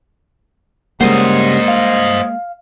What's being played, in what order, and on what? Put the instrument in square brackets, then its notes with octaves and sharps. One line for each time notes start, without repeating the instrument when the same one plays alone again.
[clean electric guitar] C#3 G3 F#5 [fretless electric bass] G#3 A#3 [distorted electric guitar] C5 D#5
[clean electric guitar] F5